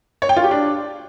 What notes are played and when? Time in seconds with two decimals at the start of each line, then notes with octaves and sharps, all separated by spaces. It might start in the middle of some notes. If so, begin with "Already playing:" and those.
0.22 C#5
0.29 G5
0.36 F4
0.44 G4
0.51 D4